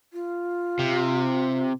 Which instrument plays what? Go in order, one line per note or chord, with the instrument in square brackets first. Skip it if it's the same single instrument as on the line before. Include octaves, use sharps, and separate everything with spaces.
[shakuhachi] F4
[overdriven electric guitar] C3